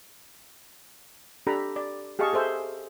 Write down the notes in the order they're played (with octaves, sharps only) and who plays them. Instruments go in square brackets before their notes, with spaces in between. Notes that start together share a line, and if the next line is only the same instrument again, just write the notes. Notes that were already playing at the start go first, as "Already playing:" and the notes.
[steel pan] D4 G4 A4 A#5 B5
D5
G4 G#4 D#5 F5 A5 C#6
G#4 A4 C5 E5